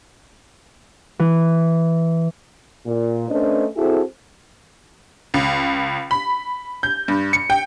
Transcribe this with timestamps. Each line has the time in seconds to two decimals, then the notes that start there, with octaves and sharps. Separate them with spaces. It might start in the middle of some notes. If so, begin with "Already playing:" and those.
1.19 E3
2.86 A#2
3.29 A3 C#4 D4 B4 C5 D#5
3.76 C4 E4 F#4 G#4 A4
5.34 C#2
6.11 B5
6.83 G6
7.08 G2
7.33 C#7
7.50 G5